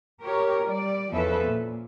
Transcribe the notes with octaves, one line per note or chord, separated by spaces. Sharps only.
G4 A#4 C#5
G3 D5
E2 F3 C#4 A4 B4 E5
A#2